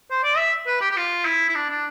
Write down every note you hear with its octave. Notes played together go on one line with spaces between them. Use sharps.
C5
D5
E5
B4
G4
G4
F4
E4
E4
D4
D4